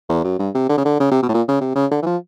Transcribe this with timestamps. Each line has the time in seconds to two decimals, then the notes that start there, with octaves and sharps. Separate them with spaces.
0.09 E2
0.24 F#2
0.39 G2
0.55 C3
0.70 D3
0.78 C#3
0.85 D3
1.00 C#3
1.11 C3
1.23 B2
1.29 A2
1.34 A#2
1.49 C#3
1.61 C3
1.75 C#3
1.91 D3
2.02 E3
2.06 F3